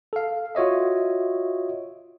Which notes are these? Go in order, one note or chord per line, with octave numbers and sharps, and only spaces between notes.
A4 F5
F4 F#4 C#5 D#5 E5